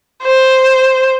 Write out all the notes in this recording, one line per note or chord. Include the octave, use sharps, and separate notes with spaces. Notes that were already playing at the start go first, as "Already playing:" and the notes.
C5